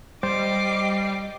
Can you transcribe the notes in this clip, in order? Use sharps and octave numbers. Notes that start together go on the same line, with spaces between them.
G3 C5 D#5 G5 D6 C7